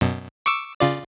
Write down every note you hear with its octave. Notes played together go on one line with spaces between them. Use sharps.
F#2 B2
C#6 D6 E6
C#3 F4 D5